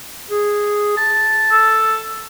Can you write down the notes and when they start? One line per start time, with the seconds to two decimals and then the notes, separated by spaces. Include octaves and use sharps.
0.31 G#4
0.97 A5
1.51 A4